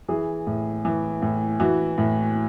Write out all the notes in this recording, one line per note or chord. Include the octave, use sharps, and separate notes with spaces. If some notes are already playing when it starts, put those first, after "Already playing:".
E3 G#4
A2
E3
A2
E3 F#4
A2